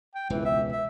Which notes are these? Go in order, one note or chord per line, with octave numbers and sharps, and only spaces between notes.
G5
E1 C#2 E3
E5
E5